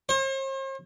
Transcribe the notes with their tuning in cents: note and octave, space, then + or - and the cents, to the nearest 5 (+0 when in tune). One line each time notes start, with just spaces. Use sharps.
C5 +45